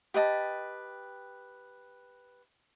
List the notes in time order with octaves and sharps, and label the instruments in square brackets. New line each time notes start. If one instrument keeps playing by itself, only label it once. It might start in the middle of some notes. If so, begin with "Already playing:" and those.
[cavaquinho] G4 B4 D#5 A5